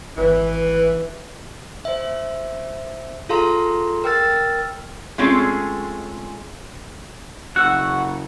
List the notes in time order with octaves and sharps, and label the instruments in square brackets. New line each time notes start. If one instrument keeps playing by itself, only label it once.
[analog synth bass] G#1 [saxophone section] E3 [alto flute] B4
[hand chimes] C5 E5
F4 G#4 A4 F5 A#5 C6
A#4 G5 E6 F6 A6
[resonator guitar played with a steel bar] G#3 A3 C4 C#4 F4 G#4
[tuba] F#1 [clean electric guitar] F#4 [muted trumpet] F#5 [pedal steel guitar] C#6 E6 F#6